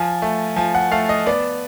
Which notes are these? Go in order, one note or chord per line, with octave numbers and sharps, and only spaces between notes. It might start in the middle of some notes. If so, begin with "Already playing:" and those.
Already playing: F3 G#5
A3
F3 G#5
F#5
A3 F5
D#5
B3 D5